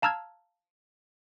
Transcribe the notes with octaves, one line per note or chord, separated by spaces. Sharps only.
F5 A5 A#5 E6 F6 G#6